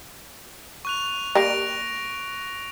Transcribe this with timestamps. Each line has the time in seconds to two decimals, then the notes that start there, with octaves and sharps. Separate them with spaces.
0.85 C#6 F#6 F7
1.35 G3 A#3 A#6 D7 F7